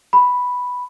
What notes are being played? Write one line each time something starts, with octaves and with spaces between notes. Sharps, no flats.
B5